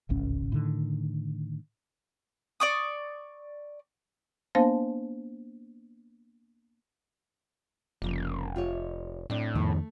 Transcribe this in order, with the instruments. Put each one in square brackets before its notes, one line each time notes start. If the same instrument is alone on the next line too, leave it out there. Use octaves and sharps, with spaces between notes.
[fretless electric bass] D1 G#1 C#2 C#4
A2 D3 D#3
[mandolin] D5 C#6 D#6
[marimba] A#3 B3 D4 C5 F5 A5
[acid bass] F1 [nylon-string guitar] C#3 F3 A#3
[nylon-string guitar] F4 G4 C#5
[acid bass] A2 [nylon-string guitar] C4 D4
[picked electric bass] F2 D#3 [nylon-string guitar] A3